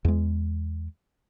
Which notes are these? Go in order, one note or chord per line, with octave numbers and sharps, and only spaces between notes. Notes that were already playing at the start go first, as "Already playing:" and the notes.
E2 G#3